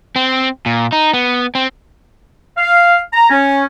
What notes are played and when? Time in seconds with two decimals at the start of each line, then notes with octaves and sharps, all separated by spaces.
0.16 C4
0.66 A#2
0.92 D#4
1.14 B3
1.55 C4
2.58 F5
3.13 A#5
3.30 C#4